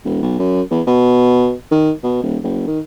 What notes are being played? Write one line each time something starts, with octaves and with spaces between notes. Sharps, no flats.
E1
B1
F#2
E2
B2
D#3
B2
D#1
F#1
D#3